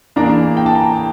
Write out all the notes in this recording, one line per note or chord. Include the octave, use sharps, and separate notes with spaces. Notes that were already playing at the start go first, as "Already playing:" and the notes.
E2 E3 A#3 D4 A#5
G5
A5
A#5